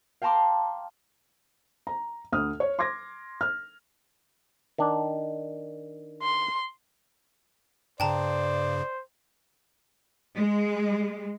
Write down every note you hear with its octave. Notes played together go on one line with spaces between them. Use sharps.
F5 G5 A5 A#5 C6 D6
A#5
D2 D#6 F6
C#5
C6 D6 G#6 A#6
F6
D#3 D4
C6
G2 C#3 C5 D5 G5 A5 A#5
G#3